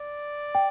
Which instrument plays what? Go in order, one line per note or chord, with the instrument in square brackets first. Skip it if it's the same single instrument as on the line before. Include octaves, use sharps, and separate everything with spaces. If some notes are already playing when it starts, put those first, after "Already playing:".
Already playing: [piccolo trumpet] D5
[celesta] G5